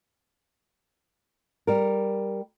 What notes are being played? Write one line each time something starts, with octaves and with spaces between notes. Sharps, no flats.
G3 A#4